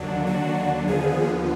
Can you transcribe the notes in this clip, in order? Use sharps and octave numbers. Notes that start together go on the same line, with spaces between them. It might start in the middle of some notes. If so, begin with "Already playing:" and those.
Already playing: D#2 D3 F#3 D4
F#4
D#2 D3 F3 B3 G#4